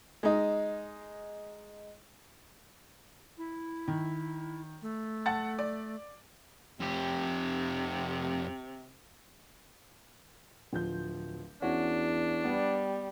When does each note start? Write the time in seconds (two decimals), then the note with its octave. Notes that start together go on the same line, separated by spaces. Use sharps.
0.23 G#3 D#4
3.38 E4
3.88 D#3
4.82 A3
5.26 F#5 A5 A6
5.59 D5
6.80 F2 C3 G4
10.73 D1 F3 G6
11.62 E2 C#4 D4 F#4
12.45 G3 B3